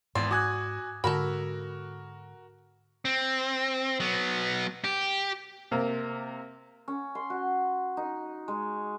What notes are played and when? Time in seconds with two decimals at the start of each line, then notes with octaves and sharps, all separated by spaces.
0.15 G#1 E2 G#2 D5 C6
0.31 F#4 G#5 D6 D#6 F#6 G#6
1.04 G#2 D3 F#4 A4 A#4 B5
3.05 C4
4.00 F#3 B3
4.84 G4
5.71 C3 A#3
6.88 C#4
7.15 C6
7.30 F#4
7.97 D#4
8.48 G#3